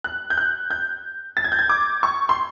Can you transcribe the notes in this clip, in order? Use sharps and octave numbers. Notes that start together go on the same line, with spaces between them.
F#6
G6
F#6
G6
A6
G#6
G6
G#6
D6
C#6
C6